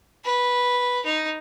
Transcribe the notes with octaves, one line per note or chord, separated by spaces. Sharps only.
B4
D#4